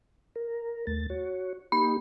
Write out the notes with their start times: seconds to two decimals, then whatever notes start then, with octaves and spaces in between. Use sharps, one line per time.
0.36 A#4
0.87 D#2 A3 A6
1.10 F#4 C#5
1.72 A#3 D#4 G4 B5